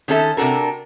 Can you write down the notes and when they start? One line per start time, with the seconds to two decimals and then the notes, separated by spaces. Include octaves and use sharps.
0.08 D#3 C#4 A4 E5
0.37 C3 D4 F#4 A4 A#4